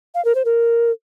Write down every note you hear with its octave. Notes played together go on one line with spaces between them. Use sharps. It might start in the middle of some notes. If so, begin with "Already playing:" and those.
F5
A#4
C5
A#4